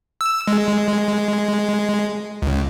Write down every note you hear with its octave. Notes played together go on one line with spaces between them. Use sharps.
E6
G#3
C#2